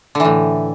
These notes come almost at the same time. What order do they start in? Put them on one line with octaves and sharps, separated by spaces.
D3 E3 A2